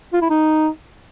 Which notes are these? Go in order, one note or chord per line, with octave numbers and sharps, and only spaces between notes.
F4
E4
D#4